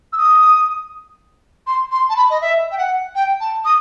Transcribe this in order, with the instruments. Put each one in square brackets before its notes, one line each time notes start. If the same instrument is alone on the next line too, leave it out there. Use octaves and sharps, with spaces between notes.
[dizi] E6
D#6
C6
C6
A5
B5
D#5
E5
G5
F#5
G5
A5
D#6